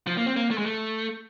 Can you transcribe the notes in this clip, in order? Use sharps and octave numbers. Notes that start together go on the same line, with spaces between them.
F3
A#3
C4
A#3
A3
G#3
A3